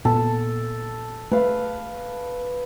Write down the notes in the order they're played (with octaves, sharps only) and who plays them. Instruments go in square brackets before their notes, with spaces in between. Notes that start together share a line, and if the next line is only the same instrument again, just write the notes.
[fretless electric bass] A#2 B3 [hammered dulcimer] A4
[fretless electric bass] A3 [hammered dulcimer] B4 F5